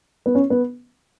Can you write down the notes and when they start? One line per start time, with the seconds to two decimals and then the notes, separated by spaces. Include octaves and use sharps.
0.26 B3
0.35 C#4
0.50 B3